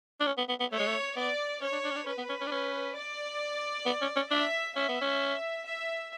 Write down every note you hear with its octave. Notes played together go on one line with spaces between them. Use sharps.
D4
C#4
B3
B3
B3
A3 C#5
G#3
A3
B3 D5
C#4 C#5
D4
D4
C#4
D4
C#4 B4
B3
C#4
C#4
D4
C#4
D5
B3
C#4
C#4
D4 E5
C#4 E5
B3
C#4
E5